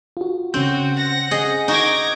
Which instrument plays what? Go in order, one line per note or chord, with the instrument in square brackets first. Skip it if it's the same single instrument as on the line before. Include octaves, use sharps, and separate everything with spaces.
[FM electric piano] F4 F#4
[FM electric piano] C#3 C#4 G6 [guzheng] C4 [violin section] F#4
[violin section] F#5 A#6
[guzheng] G#4 D#5
[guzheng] D#4 F#4 [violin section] D6 G#6 A#6